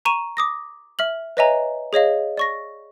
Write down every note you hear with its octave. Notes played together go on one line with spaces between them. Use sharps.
A#5 C#6 D#7 E7
D6 D#6 A#6
E5 F6 F#7
B4 C#5 D#5 E5 G#5 A#5
G#4 C#5 D#5 F5
D5 C#6 A#6